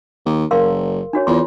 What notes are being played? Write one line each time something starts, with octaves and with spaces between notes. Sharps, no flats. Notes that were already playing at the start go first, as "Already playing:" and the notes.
D#2
F#1 A#4 F5 C6
D4 F#4 C#5
E2 F4 C6